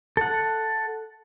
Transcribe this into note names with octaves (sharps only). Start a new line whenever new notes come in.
A4 F#5